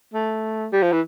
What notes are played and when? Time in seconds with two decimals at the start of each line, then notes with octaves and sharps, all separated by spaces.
0.14 A3
0.72 G3
0.82 F3
0.92 E3